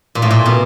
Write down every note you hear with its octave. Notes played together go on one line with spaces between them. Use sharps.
A#2
A2
A#2
B2